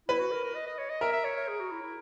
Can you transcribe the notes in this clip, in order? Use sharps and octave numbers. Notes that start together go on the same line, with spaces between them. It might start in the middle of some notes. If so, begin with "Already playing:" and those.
E4 B4
F#4
A#4
A#4
D#5
D#5
C#5
D#5
A#4 E5
E5
C#5
C#5
G#4
F#4
E4
E4